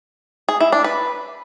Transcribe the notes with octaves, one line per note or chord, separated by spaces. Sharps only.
G#4
E4
D4
B4